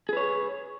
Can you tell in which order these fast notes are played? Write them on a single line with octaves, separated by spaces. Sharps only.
G#4 B4 C#5